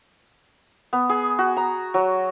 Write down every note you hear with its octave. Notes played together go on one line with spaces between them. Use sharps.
B3
G#4
F#4
A#5
F#3